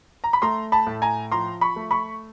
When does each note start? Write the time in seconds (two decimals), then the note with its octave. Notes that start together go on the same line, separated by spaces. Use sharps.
0.24 A#5
0.33 B5
0.42 A3 A#5 C6
0.72 A5 B5
0.87 A2
1.02 G#5 A#5
1.32 F3 A#5 C6
1.61 B5 C#6
1.76 A3
1.91 B5 C#6